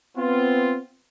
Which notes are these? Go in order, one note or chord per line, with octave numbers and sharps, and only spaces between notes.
B3 C4 F4